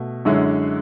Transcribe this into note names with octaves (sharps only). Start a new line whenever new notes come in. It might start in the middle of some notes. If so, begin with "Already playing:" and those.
Already playing: B2 A3
F#2 D3 G#3 C#4 E4